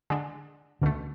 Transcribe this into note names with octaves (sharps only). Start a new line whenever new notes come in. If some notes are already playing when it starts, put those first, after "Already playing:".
D3 G#3 D4
C#2 B2 D3 A3